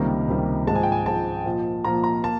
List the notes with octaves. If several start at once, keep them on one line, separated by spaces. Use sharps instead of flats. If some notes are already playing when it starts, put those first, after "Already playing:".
Already playing: C#2 C3 D#3 G3 A#3 A#5
C#2 C3 D#3 G3 A#3
G#2 F3 G#3 A5
G#5
G5
G#5
G#2 F3 G#3 A5
A#2 F3 A#3
A#2 F3 A#3 A#5
A#5
A#3 A5